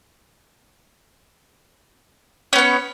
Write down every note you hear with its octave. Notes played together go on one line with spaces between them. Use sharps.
B3 C#4 C#5